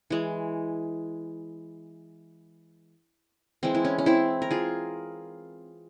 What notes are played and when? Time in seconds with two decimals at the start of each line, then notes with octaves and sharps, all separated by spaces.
0.10 E3 G#3
3.63 E3 G#3 C4
3.75 E4
3.85 C#4
3.98 C#4
4.06 C4 E4
4.42 A#4
4.51 F4 G#4